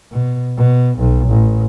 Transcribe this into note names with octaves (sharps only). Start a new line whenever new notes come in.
B2
B2
B1
A1